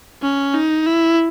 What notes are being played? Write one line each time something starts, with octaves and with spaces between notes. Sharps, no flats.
C#4
D#4
E4